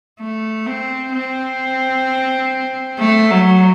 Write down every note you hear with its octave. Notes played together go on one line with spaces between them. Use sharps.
A3
C4
C4
A3
F#3